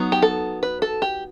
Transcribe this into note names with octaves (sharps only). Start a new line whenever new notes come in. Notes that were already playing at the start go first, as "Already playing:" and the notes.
Already playing: F#3 B3 D#4
G4
A4
B4
A4
G4